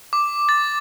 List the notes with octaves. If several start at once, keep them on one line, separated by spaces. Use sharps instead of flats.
D6
A6